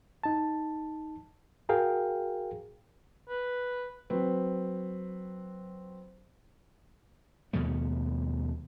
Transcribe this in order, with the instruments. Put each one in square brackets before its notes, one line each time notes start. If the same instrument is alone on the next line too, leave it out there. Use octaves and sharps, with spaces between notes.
[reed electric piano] D#4 A5
F#4 G#4 A#4 F5 G5
[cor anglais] B4
[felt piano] F#3 C4 B4
[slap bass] D#2 B2 F3 A3